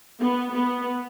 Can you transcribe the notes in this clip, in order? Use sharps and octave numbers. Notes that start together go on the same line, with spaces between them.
B3
B3